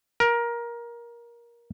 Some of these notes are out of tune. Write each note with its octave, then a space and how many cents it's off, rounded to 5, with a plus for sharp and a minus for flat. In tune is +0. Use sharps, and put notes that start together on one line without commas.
A#4 +20